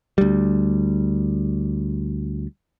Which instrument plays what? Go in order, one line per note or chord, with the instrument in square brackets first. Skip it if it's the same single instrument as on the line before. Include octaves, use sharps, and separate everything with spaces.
[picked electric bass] D2 G3